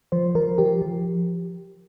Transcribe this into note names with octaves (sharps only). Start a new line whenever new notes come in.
F3 C5
F3 A#4
F3 G4
F3